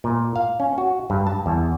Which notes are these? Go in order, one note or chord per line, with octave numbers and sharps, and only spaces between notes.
A#2
F5
C#4
F#4
G2
A5
E2